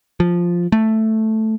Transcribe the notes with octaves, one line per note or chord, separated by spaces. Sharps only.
F3
A3